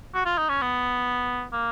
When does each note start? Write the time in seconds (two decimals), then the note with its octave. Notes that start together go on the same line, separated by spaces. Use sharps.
0.15 F#4
0.25 F4
0.38 D#4
0.49 C#4
0.62 B3
1.53 A#3